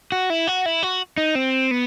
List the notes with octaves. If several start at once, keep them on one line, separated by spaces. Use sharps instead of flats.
F#4
E4
F#4
E4
F#4
D#4
C4
B3